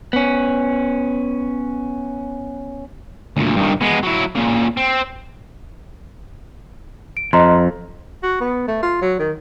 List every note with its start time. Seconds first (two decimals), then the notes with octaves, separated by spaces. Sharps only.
0.13 B3 C#4
3.37 D2 A#2
3.56 G2 D#3
3.81 G#3 B3
4.03 F#3 E4
4.35 A#2 C#3
4.77 C4
7.17 D7
7.33 F2 D#5 A#5 C6
8.23 F#4
8.40 B3
8.68 A3
8.83 F4
9.01 F#3
9.19 D#3